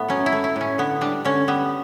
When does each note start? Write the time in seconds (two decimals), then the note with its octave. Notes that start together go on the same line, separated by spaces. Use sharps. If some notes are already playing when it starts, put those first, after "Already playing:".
Already playing: A2 A3 B3
0.08 F#3 C#4
0.26 E4
0.32 A3
0.44 E4
0.56 A2 C#4
0.78 D3 B3
1.01 G3 D4
1.25 D3 C#4
1.48 G3 B3